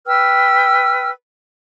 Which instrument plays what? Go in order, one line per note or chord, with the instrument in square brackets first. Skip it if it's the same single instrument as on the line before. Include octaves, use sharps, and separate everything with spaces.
[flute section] B4 G5 E6 F6